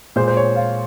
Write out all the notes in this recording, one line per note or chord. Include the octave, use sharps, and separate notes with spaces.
A#2 G#3 C5
C5
C#5
F4